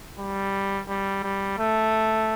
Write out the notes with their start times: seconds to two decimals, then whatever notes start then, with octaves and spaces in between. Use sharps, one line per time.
0.19 G3
0.88 G3
1.23 G3
1.58 A3